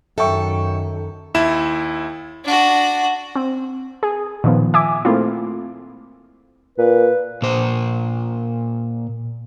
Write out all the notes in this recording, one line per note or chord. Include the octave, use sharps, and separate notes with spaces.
F#2 D#3 A4 E5 G5 C#6
D#2 E4 E7
D4 F#4
C4
G#4
A#2 D#3 F3 B3
E5 G#5 D6
A3 A#3 C4 E4 F4
A#2 B4
A#2 C5